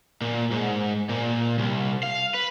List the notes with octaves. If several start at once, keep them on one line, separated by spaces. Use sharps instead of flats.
A#2
G#2
A#2
C2
F5
B4